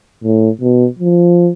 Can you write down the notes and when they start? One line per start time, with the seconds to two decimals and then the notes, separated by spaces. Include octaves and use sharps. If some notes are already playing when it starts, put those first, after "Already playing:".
0.24 A2
0.61 B2
0.99 F3